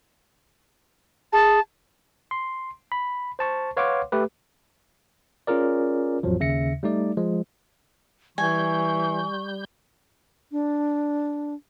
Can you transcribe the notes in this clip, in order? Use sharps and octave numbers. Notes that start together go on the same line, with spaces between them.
G#4 A5
C6
B5
C5 A5 C#6
B4 C#5 F5 F#5 C6 D6
A3 G4 B4
C#4 F4 G#4 A#4 D5
A1 F2 F3 F#3
D#2 C#3 E5 A#6 C#7
G3 A3 D#4 D5
F3 G#3
E3 G3 G#5 C#6 G6
D4